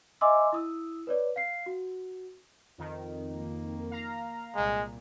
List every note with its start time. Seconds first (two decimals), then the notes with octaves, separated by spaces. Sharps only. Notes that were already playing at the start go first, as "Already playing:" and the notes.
0.21 D#5 E5 G#5 C6 D6 E6
0.53 E4 D#6 E6
1.07 B4 C#5 D5
1.36 F5 C7
1.66 F#4
2.78 F2 D#3
3.33 A#3
3.91 F5 A#5
4.55 C2 A#2 G#3